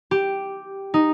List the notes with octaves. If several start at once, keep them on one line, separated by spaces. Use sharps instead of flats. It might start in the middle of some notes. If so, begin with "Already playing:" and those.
G4
D#4